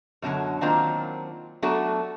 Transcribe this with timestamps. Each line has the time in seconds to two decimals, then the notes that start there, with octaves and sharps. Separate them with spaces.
0.22 F#2 B2 D3 F#3
0.61 D#3 F#3 A#3 C4 D4 F4
1.62 F#3 A3 B3 D4 F#4 A4